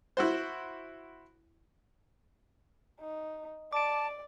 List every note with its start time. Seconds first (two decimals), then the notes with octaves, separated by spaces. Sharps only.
0.17 E4 F#4 C5
3.00 D#4
3.73 D5 A5 D6 D7